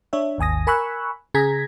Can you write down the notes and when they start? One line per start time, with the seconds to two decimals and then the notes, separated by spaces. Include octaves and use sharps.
0.13 D4 C#5 E5
0.38 G#1 D#2 G#5 D#6 A#6
0.67 A#4 G#5 B5 C#6 E6 F#6
1.34 C#3 G#4 A#5 G#6 A#6 B6